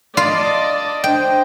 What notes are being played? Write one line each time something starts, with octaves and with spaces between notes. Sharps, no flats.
F4 D5 D#5 A5
D4 C5 D#5 G5